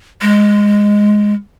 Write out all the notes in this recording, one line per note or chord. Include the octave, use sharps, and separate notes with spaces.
G#3